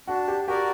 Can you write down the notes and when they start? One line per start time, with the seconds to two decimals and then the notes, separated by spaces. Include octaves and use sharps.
0.07 D4 F#4
0.28 G4
0.48 F#4 G4 A#4 D5